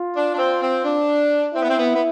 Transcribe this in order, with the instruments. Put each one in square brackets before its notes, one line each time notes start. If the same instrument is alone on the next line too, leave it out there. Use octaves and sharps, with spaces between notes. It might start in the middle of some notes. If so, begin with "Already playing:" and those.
Already playing: [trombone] F4
[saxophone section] D4
D4
C4
C4
D4
[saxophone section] C4 [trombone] E4
[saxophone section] B3
C4
B3
B3